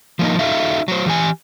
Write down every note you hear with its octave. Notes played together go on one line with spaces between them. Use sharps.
F3 A#3 D#4
D#4 F#4 A4 E5 F5
F#3 C5
E3 G4 G#5